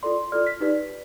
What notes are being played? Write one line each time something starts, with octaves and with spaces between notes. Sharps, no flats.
F4 A4 D5 C6
F4 A4 D5 F6
B6
D#4 G4 B4 D5